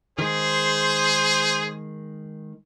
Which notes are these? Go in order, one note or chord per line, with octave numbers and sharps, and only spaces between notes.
D#3 G#3 G#4 C5